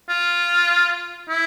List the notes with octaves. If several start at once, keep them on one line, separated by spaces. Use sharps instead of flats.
F4
E4